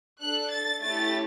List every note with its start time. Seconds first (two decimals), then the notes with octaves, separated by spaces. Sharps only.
0.21 D4 A4 F#6
0.51 A6
0.82 A3 C#4 E4 G4 A6